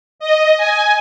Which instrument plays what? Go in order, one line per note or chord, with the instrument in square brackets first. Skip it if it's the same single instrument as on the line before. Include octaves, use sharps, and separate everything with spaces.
[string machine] D#5
G#5